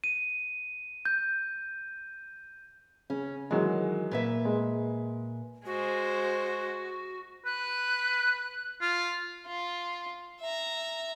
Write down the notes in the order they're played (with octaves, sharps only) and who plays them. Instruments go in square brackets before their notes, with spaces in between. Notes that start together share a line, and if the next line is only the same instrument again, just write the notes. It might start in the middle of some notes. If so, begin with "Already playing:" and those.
[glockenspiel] D#7
G6
[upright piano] C#3 [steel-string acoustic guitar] C#4
[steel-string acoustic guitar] D#3 [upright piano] E3 F#3 G#3
[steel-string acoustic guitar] A#2 B4 E5
[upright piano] G#3
[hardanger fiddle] G#3 C5 [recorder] F#4
[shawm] B4 [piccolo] F#6
[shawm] F4 [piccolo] F6
[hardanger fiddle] F4
E5 A#5